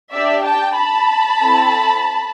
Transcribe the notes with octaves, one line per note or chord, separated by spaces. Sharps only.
D4 G4 D5 E5
G5 A5
A5 B5
C4 E4 A4